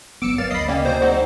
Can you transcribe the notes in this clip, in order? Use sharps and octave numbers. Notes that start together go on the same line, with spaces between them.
G1 F#3 B3 D6 E6 C#7 D7
A#4 B4 C#5 F5 A6
D2 D#5 B5 C7
C#3 A#3 C#4 D5 D#5 G5
C3 F#3 C5
C4 D#4 G#4 F#5 C#6